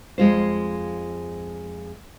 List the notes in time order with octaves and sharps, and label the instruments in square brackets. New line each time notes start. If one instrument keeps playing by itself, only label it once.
[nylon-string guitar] F2 G#3 F4 C5